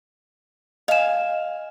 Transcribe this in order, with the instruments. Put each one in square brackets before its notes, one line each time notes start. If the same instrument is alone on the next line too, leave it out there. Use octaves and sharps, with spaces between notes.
[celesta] D#5 E7 [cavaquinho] F5 G#5